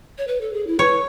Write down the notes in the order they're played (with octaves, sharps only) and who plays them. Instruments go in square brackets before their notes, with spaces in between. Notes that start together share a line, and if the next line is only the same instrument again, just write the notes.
[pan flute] C#5
B4
A4
G#4
E4
[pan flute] B4 [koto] C#5